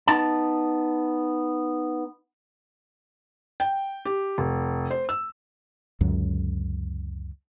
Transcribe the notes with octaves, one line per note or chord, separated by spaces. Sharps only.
B3 D#4 A5
G5
G4
F1
C5
E6
C#2 F#2 D3 F#3